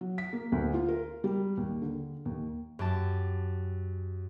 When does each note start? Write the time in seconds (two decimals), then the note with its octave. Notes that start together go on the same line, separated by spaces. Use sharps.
0.01 F#3
0.18 B6
0.33 A#3
0.52 D2
0.74 F4
0.88 A#4
1.24 G3
1.57 D#2
1.82 D3
2.25 D#2
2.79 F#2 G4 A5